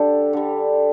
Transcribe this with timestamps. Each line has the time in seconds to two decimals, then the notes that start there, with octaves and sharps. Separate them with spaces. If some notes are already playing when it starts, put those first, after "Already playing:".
Already playing: D3 G3 D4 G4 A4
0.33 D3 G3